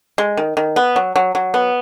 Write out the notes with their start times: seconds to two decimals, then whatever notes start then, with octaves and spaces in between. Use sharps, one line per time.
0.18 G#3
0.37 D#3
0.57 D#3
0.76 B3
0.96 F#3
1.16 F#3
1.35 F#3
1.54 B3